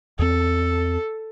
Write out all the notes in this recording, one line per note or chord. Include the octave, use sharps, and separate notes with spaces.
E2 C4 A4